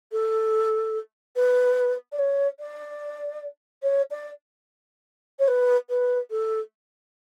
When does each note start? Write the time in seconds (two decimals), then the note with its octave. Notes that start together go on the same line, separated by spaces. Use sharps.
0.12 A4
1.36 B4
2.12 D5
2.18 C#5
2.59 D5
3.82 C#5
4.10 D5
5.39 C#5
5.47 B4
5.89 B4
6.30 A4